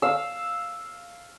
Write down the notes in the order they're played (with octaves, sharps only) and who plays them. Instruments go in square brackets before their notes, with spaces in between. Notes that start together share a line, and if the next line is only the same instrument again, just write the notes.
[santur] F5 E6